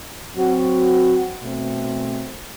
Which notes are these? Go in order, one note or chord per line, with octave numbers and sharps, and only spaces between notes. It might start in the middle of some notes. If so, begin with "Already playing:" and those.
F#3 C4 F#4
B2 A3 C4